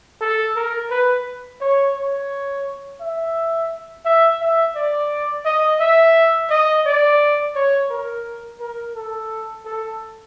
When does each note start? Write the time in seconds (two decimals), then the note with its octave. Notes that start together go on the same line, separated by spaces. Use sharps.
0.21 A4
0.56 A#4
0.90 B4
1.61 C#5
1.96 C#5
3.01 E5
4.05 E5
4.41 E5
4.76 D5
5.45 D#5
5.80 E5
6.50 D#5
6.86 D5
7.55 C#5
7.90 A#4
8.60 A#4
8.95 A4
9.65 A4